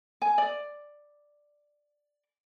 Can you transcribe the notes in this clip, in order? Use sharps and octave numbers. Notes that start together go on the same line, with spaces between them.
G#5
D5